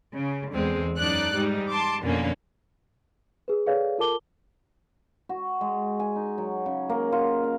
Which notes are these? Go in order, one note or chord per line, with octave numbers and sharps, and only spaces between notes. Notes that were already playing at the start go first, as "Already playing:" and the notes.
C#3
E2 D3 G#3 C4
F#2 D4 D#4 D5 F#6
G#2 G3 D#4
A5 C6 D6
F2 B2 D3 A#3 C#4
G#4 B4
G#4 A4 B4 C#5 D5 F5
F4 A4 A#4 A5 D6 G7
F#4
G#3
G#5
D#4
F#3
C#3
A#3
F4
F5